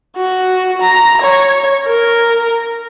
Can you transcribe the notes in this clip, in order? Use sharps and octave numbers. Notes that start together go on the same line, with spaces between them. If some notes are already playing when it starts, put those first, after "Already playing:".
F#4
A#5
C#5
A#4